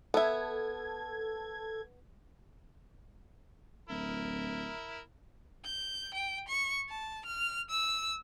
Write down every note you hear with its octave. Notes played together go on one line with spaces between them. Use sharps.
B3 A4 E5 G#6
D1 E4 A#4
G6
G5
C#6
A5
F6
E6